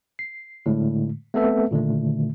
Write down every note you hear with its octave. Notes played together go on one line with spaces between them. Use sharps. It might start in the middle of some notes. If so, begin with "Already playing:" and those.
C7
A2 D3 G#3 A3
A3 B3 C4 A4 B4 E5
A#2 D3 D#3 A3